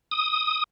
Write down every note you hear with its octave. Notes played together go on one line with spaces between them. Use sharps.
D#6